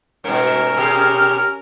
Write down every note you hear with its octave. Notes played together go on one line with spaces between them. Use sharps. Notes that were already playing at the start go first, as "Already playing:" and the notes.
G2 B2 C#4 A#4
B2 G4 G#4 F6